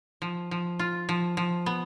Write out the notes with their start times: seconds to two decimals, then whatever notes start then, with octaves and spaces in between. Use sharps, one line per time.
0.22 F3
0.51 F3
0.79 F4
1.09 F3
1.37 F3
1.66 B3